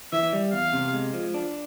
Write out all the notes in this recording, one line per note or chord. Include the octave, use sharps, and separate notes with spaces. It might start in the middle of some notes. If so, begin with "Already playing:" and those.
E3 E5
G3
E2 F5
C3
G#3
F3
D4